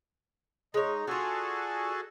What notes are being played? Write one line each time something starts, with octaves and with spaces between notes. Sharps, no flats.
G#3 D#4 C#5
D4 F4 F#4 G#4 A4